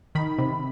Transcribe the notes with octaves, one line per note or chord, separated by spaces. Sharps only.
D#3 B5
C3